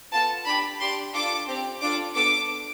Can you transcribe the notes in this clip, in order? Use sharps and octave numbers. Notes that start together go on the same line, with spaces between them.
B3 F4 A4 A5
D4 G4 B5
D4 G4 C6
D4 F4 A4 D6
C4 G4
D4 F4 A4 D6
B3 D4 A4 D6